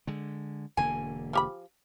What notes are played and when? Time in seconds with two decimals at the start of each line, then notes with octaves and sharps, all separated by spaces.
0.07 D3 G#3
0.77 E1 D3 A#3 G#5
1.33 F3 G4 B5